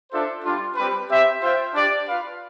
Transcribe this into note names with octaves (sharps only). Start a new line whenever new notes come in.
D4 F4 A4 C5 E5
G3 D4 F4
G3 C4 G4 B4
C4 G4 C5 E5 G5
F4 C5 E5 G5
D4 G4 D5
F4 B4 F5